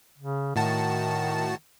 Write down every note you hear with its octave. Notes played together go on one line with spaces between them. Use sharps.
C#3
A2 D#3 F#4 A5